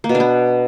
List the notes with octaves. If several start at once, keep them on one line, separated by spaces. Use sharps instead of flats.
A#3
B2
D4
B3